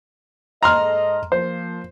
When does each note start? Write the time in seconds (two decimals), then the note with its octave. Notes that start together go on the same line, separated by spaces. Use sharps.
0.63 G#2 A4 D#5 A#5 C6 F6
1.32 F3 A#3 C5